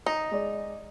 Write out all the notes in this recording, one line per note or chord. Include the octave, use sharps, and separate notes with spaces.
D#4
G#3 D5